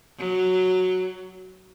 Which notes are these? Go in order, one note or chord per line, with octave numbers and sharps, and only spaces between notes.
F#3